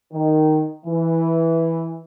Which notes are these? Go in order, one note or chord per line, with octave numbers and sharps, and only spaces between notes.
D#3
E3